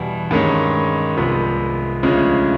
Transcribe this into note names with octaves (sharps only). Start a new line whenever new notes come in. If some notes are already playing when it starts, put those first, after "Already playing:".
Already playing: E2 B2 G3
G2 D#3 G#3 C#4
C2 C3 F3 G#3 B3
D2 C#3 F3 G#3 C#4